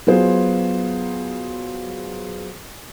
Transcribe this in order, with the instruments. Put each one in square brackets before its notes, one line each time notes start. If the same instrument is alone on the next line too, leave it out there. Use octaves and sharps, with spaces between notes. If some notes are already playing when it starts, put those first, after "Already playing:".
[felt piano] F#3 B3 F4 F#4 G#4 C5